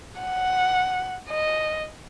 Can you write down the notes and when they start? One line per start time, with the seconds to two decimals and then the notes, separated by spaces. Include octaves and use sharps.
0.22 F#5
1.30 D#5